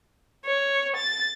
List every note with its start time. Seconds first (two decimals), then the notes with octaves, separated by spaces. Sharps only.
0.46 C#5
0.97 A6